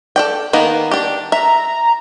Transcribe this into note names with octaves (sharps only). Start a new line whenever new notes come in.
A4 D5 G5
D#3 A#3 B3
D4 G4
E5 A#5